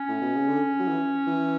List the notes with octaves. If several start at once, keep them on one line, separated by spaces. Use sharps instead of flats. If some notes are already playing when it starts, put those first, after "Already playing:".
Already playing: C#4
A2
B2
C#3
D3
F#3
E3
E3